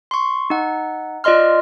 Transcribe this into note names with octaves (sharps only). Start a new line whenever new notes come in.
C6 C#6
D#4 F#5
F4 D5 D#5 C6 F6